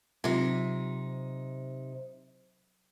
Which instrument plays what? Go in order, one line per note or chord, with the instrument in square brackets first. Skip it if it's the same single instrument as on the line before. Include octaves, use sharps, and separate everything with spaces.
[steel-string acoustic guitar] C3 D#4 [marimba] F#3 F4